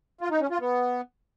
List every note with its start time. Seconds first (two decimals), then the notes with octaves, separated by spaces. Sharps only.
0.21 F4
0.31 D#4
0.41 C#4
0.51 F4
0.61 B3